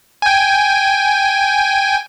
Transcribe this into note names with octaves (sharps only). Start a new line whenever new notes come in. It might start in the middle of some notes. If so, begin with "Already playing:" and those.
G5 G#5